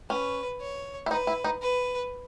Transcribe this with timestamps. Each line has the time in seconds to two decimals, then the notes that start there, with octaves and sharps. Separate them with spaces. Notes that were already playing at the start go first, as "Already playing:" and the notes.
0.10 C#4 B4
0.60 C#5
1.06 E4
1.10 D#4 B4
1.27 E4
1.44 D#4
1.62 B4